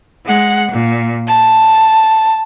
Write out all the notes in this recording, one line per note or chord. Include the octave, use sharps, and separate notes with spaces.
G#3 F#5
A#2
A5